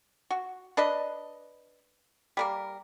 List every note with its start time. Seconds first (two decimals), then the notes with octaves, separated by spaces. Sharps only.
0.30 F#4
0.77 D4 B4 D#5
2.37 G3 A#3 A#4